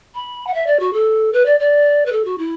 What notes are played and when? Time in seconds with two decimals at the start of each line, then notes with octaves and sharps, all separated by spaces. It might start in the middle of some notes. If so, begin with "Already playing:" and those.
0.15 B5
0.47 F#5
0.54 E5
0.66 D5
0.80 F#4
0.93 A4
1.33 B4
1.46 D5
1.60 D5
2.06 B4
2.12 A4
2.25 F#4
2.38 E4